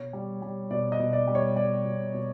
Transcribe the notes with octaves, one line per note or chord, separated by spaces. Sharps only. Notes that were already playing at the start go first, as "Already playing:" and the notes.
Already playing: B2 C#5
G3
G3
B2 D5
D#5
B2
D5
G3
C#5
G3 D5
B2
B2